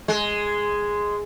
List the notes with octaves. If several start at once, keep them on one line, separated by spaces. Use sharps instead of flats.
G#3